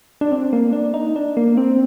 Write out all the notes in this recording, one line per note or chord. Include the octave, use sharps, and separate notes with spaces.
D4
C4
A#3
D4
D#4
D4
A#3
C4